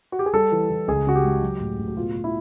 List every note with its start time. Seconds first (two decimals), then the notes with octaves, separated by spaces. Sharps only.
0.12 F#4
0.19 G4
0.26 G#4
0.34 G3 A4
0.52 E3
0.70 E3
0.88 C#2 G#4
1.07 C#3 F#4
1.15 G4
1.24 G#3
1.42 F#3
1.61 A2
1.79 A2
1.88 F#4
1.97 B2 F4
2.15 B2
2.24 E4